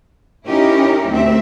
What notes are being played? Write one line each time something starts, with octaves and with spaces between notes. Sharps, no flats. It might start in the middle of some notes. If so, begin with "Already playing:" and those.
C#4 D#4 E4 G4 A#4
D2 C4 E5